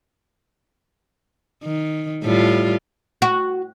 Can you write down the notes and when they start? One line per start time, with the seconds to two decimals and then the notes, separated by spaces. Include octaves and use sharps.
1.64 D#3
2.23 A2 G3 F4
3.22 F#4